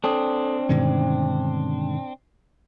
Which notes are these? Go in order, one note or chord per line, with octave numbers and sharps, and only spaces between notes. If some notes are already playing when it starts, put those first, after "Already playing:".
C4 D4 A4 D#6
G2 B2 D3 D#3 G#3 C#4